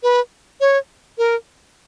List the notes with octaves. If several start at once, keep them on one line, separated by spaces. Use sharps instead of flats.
B4
C#5
A#4